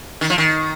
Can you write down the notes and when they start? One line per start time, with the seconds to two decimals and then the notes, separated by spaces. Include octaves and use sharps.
0.21 D#3
0.30 F3
0.38 D#3